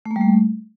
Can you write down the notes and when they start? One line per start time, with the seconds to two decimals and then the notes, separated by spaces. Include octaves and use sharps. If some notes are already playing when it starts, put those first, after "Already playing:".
0.05 A3
0.11 A#3
0.16 G3
0.21 A3